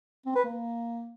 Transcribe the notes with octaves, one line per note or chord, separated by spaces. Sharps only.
C4
B4
A#3